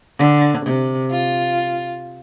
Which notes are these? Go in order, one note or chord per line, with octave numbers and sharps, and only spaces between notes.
D3
C3
F4